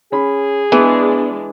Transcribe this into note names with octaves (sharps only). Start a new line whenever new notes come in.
C#4 G#4 B5
E3 G#3 B3 D4